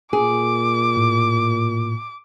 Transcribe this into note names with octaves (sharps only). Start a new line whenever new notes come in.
A#2 G#4 D6
A2